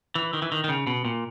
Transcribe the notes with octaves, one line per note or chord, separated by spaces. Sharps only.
E3
D#3
E3
D#3
D#3
C#3
B2
A#2